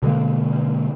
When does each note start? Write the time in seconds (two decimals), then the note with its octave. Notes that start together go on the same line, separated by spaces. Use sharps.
0.02 B2 D3 G#3 A#3